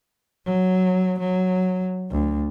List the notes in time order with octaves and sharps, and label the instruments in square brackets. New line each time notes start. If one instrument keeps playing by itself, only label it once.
[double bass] F#3
F#3
D2